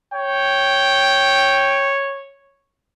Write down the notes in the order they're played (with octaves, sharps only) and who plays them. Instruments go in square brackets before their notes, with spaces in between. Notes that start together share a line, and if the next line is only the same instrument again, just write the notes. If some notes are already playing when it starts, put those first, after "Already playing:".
[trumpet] C#5 [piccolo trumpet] G5